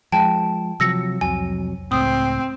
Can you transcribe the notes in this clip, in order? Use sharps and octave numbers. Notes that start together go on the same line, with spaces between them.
F3 G#3 G5 A5
C3 F3 F#3 E6 A#6 C#7
C2 F2 F#3 G#5
C#2 A2 C4 D#6